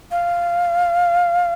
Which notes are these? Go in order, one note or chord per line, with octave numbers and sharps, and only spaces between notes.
F5